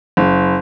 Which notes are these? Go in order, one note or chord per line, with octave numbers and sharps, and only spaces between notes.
F#1